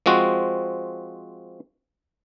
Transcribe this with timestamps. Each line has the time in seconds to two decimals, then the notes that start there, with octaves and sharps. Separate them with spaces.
0.06 F3 G#3 C4 F#4